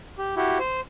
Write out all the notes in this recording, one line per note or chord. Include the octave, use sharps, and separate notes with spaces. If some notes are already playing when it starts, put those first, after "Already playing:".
G4
E4 F#4 G4
C5